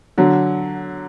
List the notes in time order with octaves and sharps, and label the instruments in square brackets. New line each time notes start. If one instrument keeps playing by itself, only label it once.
[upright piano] D3 F#3